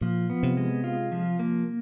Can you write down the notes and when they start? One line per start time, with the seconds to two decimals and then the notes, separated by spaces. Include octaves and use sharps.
0.01 A#2 F3
0.30 B3
0.43 C3
0.57 G#3
0.84 F4
1.12 F3
1.39 A#3